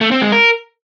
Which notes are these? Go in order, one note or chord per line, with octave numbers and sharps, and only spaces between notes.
A3
C4
G#3
A#4